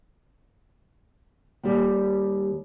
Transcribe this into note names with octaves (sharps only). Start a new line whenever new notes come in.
D#2 G3